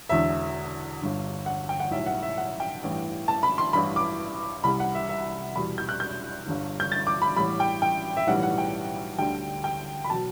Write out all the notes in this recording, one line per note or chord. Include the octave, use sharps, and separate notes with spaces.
E1 E2 D3 E5
G1 G2 D3
F#5
G5
F#5
B1 A2 G3 E5
F#5
E5
F#5
G5
A1 G2 E3
A5
B5
C6
A1 G2 E3 B5
D6
C2 C3 G3 B5
F#5
E5
E5
E2 B2 G3 B5
G6
F#6
G6
G1 G2 D3
G6
A6
D6
B5
A1 A2 G3 B5
G5
G5
E5
B1 A2 E3 G3 F#5
F#5
G5
D2 D3 G3 G5
G5
B5
B2 F#3 A5